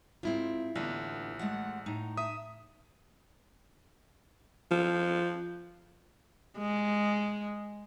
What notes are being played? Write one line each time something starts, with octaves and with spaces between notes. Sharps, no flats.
G#2 C4 E4 F4
A1 D3 A#3 B3
G#3 A3 F#5
A2 D#4
E5 D#6
F3
G#3